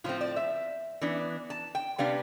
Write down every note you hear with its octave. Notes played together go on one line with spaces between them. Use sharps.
A2 F3 C4 F4
D5
E5
E3 B3 D4
A5
G5
C3 G3 B3 D4 F5